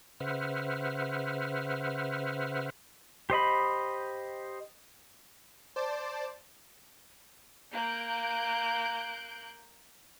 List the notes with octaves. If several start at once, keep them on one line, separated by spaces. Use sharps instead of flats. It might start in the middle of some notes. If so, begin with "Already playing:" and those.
C#3 B4 C5 E5 F#5 F6
G4 C5 D#5 B5
C5 D5 A5
A#3 F#6 G6 D7